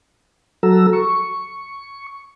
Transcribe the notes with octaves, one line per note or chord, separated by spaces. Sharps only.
F#3 F#4 A4 A#5 E6
C#6